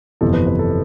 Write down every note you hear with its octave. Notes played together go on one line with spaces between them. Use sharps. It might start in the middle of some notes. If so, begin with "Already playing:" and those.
G1 F2 C3 E3 A4
B4
B4
A4